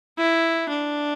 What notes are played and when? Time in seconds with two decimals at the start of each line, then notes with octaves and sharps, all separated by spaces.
0.18 E4
0.69 D4